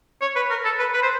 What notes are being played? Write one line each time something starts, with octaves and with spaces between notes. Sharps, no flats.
C#5
B4
A#4
A4
B4
B4
C5